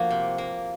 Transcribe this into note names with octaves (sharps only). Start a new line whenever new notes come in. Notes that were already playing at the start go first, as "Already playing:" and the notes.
Already playing: F3 A#3 F#4
C3
A#3